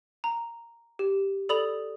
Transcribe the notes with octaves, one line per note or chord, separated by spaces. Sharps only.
A#5
G4
A4 D5 B5 D#6 F7 F#7